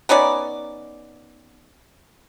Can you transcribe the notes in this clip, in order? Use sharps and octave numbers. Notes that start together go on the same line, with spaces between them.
B3 C#4 D#4 D5